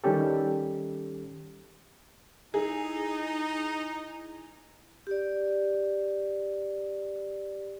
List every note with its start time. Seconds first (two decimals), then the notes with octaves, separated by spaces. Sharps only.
0.04 D#3 G3 C#4 G4 A4
2.54 D#4 E4 G#4
5.07 G4 D5